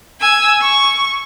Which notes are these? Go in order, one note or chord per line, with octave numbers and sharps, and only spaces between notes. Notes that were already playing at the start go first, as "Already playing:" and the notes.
G#5 E6
C#6